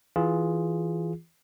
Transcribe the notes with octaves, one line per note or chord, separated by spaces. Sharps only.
E3 F4 G#4